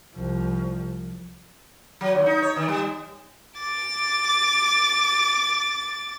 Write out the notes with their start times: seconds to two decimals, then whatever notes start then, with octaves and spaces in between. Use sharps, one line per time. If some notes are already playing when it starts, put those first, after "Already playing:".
0.15 C2 F3
2.01 F#3
2.15 D#2
2.26 D#4
2.42 C#5
2.56 D#3
2.68 G3
3.60 D6 A6